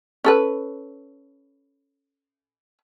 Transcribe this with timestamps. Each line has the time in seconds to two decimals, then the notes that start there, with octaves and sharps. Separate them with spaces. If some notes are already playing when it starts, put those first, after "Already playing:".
0.24 C#4 A4 B4